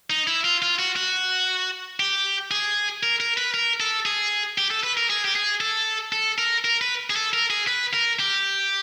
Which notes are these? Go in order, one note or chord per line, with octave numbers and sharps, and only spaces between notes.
D#4
E4
F4
F4
F#4
F#4
G4
G#4
A#4
A#4
B4
A#4
A4
G#4
G4
A4
B4
A#4
G#4
G4
G#4
A4
A4
A#4
A#4
B4
G#4
A4
A#4
G#4
B4
A#4
G4